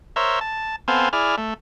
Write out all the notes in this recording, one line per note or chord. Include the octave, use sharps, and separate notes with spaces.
A#4 C5 C#5 E5
A5
B3 C4 A4 C5 F5 G#5
E4 G#4 D5 F6
A3